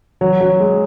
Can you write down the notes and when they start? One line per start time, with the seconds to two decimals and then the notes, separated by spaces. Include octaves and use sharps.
0.21 F#3
0.41 F#3
0.60 G#3